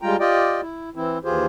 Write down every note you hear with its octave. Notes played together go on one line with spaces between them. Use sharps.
G3 G#3 F4 G5 A#5
F4 G4 D5 D#5 G5
E4
E3 C4 E4
D#2 E3 F4 G4 G#4 C5